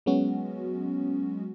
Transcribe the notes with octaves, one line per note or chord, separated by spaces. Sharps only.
F#3 G#3 B3 C#4 F#4